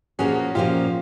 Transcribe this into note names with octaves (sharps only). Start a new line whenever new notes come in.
A#2 F3 A#3 C#4 F#4 G#4
A#2 F3 A#3 C#4 F4 G4